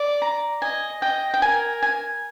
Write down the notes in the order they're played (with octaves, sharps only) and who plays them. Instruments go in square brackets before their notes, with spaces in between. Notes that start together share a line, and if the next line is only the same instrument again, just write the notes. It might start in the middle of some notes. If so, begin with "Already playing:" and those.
Already playing: [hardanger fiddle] D5
[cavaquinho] A#5
[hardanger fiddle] D#5 [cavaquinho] G#5
[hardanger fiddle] D#5 [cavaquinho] G5
[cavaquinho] G5
[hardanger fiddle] A#4 [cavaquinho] G#5
[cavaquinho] G#5